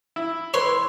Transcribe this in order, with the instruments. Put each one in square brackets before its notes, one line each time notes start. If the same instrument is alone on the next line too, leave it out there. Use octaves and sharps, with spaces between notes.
[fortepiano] E4
[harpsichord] B4 C#5 [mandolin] C6